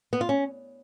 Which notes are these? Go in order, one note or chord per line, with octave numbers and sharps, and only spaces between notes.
B3
F4
C#4